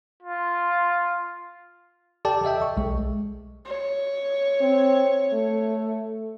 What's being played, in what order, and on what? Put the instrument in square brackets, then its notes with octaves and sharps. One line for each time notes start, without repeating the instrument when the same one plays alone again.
[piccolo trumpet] F4
[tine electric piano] G4 A4 D5 G5 A5
A4 D#5 E5 G5
C#6
B1 G#3
[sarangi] C#5
[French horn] C4
A3